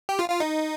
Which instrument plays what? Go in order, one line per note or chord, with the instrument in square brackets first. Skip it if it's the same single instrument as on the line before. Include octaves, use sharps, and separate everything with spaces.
[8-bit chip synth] G4
F4
F4
D#4